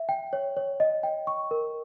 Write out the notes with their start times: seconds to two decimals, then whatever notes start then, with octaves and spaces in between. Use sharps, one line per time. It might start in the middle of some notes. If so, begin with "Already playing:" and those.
Already playing: E5
0.09 G5
0.33 C#5
0.57 C#5
0.80 D#5
1.03 G5
1.27 C#6
1.51 A#4